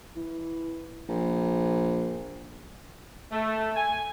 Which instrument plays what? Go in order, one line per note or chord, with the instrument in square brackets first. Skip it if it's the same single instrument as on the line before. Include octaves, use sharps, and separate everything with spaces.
[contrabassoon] E3
A#1
[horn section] A3
G#5